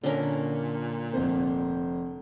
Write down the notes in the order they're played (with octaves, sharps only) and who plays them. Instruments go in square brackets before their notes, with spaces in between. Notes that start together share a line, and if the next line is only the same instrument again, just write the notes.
[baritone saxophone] A#2 [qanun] D3 C#4 A#4
[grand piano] F1 C5 [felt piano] C4